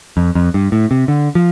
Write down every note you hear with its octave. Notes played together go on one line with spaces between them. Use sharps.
F2
F2
G2
A2
C3
D3
F3